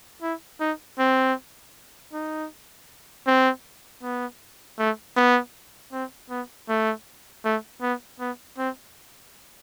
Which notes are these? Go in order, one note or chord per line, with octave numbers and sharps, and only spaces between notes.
E4
D#4
C4
D#4
C4
B3
A3
B3
C4
B3
A3
A3
B3
B3
C4